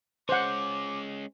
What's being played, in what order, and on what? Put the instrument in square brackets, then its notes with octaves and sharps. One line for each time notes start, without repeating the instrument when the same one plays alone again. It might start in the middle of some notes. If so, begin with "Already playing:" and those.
[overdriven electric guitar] G#3 C#4 [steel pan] C5 F#5 [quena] D6